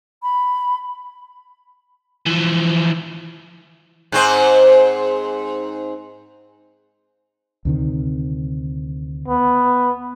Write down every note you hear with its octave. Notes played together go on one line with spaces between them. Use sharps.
B5
E3 F3
G#2 C4 C5
D2 C3 D#3
B3